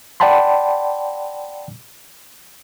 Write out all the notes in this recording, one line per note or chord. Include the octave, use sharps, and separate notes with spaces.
D5 F#5 G5 A5 B5 C6